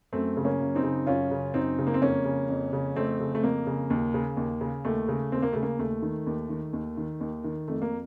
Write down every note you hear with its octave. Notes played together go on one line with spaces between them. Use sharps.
F#2 A3 C4
C#3
A#3 C#4
F#2
C4 D#4
C#3
F#2 C#4 F4
C#3
F#2 C4 D#4
C#3
A#3
C4
F2 A#3 C#4
C#3
F2
C#3
F2 A3 C4
C#3
A3
F2 A#3
C#3
D#2
C#3
D#2
C#3
D#2 A3
C#3
D#2 C4
A#3
C#3 A3
A#3
D#2 A3
D#3
D#2
D#3
D#2
D#3
D#2
D#3
F2 A3
A#3